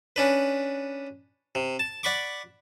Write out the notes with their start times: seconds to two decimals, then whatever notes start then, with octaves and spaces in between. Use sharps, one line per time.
0.16 C#4 D4 B4
1.55 C3
1.79 A5
2.03 D5 F#5 B5 C#6 D6